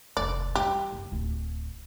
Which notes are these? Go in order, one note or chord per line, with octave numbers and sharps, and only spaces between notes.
F1 D#2 D5
E3 G3 G4
F#1
D1